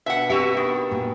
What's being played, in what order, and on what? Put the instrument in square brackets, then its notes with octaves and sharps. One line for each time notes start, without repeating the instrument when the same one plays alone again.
[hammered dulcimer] B2 D4 B4 [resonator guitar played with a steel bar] E5 F#5
[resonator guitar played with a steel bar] C4 F#4 E5 [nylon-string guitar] G4
[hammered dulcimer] D#3 [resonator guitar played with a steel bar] B3
[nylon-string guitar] A#2